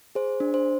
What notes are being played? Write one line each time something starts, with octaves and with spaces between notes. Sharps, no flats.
G#4 C5
D4
C5